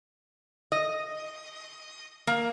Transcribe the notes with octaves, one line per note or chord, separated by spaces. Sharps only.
D#5
A#3